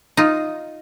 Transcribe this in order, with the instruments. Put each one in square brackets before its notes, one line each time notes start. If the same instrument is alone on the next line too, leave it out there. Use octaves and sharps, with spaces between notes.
[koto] D#4 F4